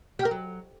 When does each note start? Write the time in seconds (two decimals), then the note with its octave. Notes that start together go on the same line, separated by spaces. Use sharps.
0.19 G4
0.25 A#4
0.31 F#3